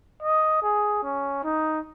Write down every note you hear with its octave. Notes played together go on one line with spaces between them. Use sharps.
D#5
G#4
C#4
D#4